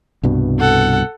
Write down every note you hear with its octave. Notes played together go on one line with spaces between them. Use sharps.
C2 G2 B2
A4 F#5